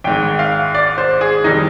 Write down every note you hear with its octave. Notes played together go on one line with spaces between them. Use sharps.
G#1 G#2 D#3 G5
F5
D5
C5
G#4
F1 D#3 G3 D#4